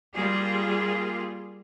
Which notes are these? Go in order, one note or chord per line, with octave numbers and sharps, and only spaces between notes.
G3 A#3 F4 G#4